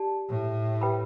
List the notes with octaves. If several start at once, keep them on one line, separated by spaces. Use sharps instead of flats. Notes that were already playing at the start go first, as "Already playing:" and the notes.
Already playing: G4 D5 A5
A2
G4 B4 G5 B5